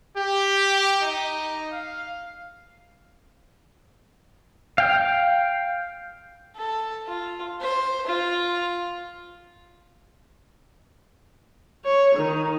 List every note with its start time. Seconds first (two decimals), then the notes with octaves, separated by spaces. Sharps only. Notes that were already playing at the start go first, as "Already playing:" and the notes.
0.17 G4
1.03 D#4
1.73 F5
4.78 F5 G5
6.56 A4
7.07 F4
7.61 C5
8.07 F4
11.84 C#5
12.14 D#3